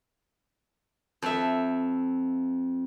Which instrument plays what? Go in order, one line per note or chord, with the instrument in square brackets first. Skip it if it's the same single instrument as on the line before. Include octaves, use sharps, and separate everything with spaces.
[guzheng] F2 E5